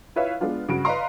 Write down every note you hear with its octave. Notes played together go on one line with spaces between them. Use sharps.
E4 F4 B4 C#5 E5 F5
G#3 B3 D4 F4
G2 C#3 F#4 D7
B4 D5 D#5 F5 A#5 C6